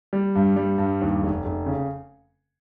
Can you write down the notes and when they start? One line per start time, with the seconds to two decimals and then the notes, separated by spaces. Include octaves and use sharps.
0.13 G3
0.35 G2
0.56 G3
0.78 G2
1.01 D#2
1.23 F1
1.45 F1
1.66 C#3